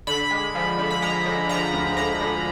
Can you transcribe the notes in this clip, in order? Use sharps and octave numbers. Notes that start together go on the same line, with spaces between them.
D3 B5
G#3
F3
D3
B5
G#3 A#5
D3
F3 A#5
D2
D3 A#5
D3